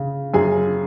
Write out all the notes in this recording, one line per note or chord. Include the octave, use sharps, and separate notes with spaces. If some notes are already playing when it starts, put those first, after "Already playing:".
Already playing: C#3
F#2 G#4 G#5